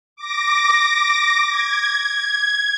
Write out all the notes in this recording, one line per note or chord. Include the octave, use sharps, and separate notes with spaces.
D6 A#6
G#6